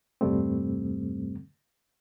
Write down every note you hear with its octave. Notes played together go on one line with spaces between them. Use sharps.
E2 G2 C3 G3 A3 C4